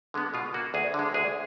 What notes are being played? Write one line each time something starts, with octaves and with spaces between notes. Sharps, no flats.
D3 G#3 B3
B2 F4
A#3 F#4
D2 G#4
D3 G#3
D2 G#4